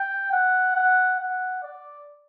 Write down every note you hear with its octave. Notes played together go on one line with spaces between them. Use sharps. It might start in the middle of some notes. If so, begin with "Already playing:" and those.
Already playing: G5
F#5
F#5
F#5
D5